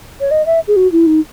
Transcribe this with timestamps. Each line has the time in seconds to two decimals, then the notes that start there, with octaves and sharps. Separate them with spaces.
0.21 C#5
0.31 D#5
0.46 E5
0.67 G#4
0.76 F#4
0.92 E4
1.06 D#4